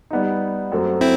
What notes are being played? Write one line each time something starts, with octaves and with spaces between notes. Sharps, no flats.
G3 B3 D#4
F#2 F#3 A3 C4
C4 E4